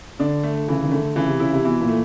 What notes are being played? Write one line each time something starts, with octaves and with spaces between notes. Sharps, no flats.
D3 D4
A3
C#3 E3
D#3
D3 A3
C#3 E3
C3
C#3 E4
C3
B2 E3
A#2
A3